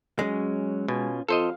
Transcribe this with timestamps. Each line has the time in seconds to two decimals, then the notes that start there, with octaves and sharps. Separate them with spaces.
0.19 F#3 G#3 C#4
0.88 B2 C#4 F4 G#5
1.29 F2 A4 C5 D#5 F5